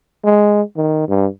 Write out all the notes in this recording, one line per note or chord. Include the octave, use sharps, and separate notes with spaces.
G#3
D#3
G2